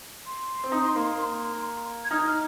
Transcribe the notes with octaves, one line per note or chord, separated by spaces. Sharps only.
C6
C4
D#4
A#3
G#6
D#4 F6
F6